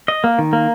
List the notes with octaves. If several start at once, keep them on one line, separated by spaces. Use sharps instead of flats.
D#5
A#3
D#3
A#3